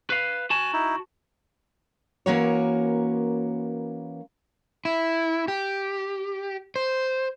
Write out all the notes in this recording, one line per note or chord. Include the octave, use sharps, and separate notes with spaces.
B4 F5
F#4 G#5 A5
D#4 E4
E3 A#3 C#4 F#4 A#4 C#5
E4
G4
C5